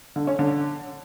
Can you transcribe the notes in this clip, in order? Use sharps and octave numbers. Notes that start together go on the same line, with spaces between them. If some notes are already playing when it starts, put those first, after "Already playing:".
D3
C#4
D3